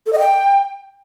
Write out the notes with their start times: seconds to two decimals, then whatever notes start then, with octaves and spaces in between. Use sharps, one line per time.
0.06 A4
0.13 D#5
0.19 G5